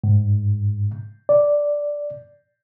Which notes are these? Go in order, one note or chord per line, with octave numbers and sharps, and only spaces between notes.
G#2
D5